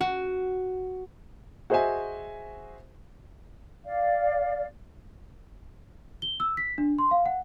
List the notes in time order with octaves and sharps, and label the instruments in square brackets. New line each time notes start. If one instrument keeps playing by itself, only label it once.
[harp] F#4
[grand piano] F#4 G#4 C5 D#5 E5 G#5
[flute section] D5 F5
[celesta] G7
E6
B6
D4
C6
F5
F#5